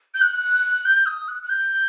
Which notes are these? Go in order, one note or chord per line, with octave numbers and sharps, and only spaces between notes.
G6
F#6
G6
D#6
F#6
F#6
G6